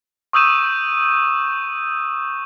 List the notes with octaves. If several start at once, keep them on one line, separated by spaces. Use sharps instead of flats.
C#6 D#6 E6 G6 D#7 E7